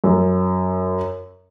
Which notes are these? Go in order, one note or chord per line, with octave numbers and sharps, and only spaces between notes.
F#2